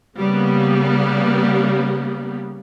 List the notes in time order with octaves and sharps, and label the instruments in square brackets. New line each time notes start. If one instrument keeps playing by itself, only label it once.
[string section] C#3 G3 A#3 B3